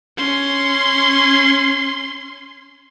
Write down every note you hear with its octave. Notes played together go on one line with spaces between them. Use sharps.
C#4 C6